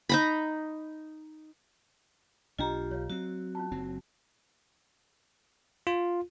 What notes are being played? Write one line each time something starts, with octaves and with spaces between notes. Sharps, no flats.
D#4 A#5 B5
B1 D4 F4 G4 D#5 G5 A#5
B1 C#5 F5
F#3 C4 F#4
C#4 F4 A5
F#1 F#3 C4 D#4
F4